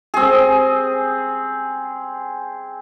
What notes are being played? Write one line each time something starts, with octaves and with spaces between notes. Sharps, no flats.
C4 G#4